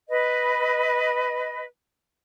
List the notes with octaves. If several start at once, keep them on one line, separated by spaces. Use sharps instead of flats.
B4 D#5